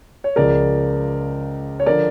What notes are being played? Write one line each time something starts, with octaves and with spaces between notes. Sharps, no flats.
C#5
C#2 C#3 F3 A#4 D5
C#5
D3 F3 A#4 D5